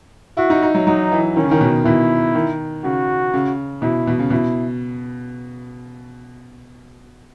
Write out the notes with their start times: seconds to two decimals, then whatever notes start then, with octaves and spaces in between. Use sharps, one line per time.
0.37 E4 F#4
0.50 D#4
0.63 D#4
0.75 F#3
0.87 F#3 D#4
1.12 E3
1.36 D#3 C#4
1.44 C#3
1.51 D#3
1.61 B2
1.85 B2 E4
2.35 D#3
2.84 C#3 F#4
3.34 C#3
3.82 B2 E4
4.07 B2
4.19 C#3
4.30 B2 E4